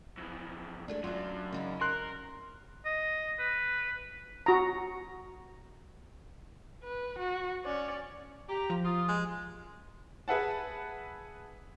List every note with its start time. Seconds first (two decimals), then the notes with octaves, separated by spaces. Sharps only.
0.17 F2 E3
0.88 G#3 A3 D4
1.04 F#2 F#3 D4 F4
1.52 C#3 D#4 E4
1.81 A#4 C6 F#6
2.85 D#5
3.39 B4
4.46 F#4 A#5
6.84 B4
7.18 F#4
7.64 C#4 D5
8.49 G4 A#5
8.70 F3
8.85 F4 D#6
9.08 G#3
10.28 G#4 B4 E5 F#5 A5